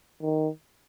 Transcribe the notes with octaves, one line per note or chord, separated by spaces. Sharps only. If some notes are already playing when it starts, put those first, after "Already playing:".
D#3